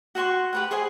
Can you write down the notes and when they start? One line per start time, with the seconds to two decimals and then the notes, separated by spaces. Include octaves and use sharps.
0.15 F#4 F#5 C6 C#6
0.53 G4 B4 F#5
0.71 G#4 C5 D#5 G#5